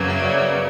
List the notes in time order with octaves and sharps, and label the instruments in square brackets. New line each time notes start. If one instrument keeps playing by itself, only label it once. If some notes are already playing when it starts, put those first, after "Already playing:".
Already playing: [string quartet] F#2 C#3 F#3 A#3 [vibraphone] B4
[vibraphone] E5
D5
C#5